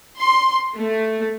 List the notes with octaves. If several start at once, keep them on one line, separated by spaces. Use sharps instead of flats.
C6
A3